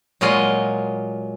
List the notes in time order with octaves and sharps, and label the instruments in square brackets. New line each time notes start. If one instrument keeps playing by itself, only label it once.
[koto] A#2 F#3 G#3 F4 D#5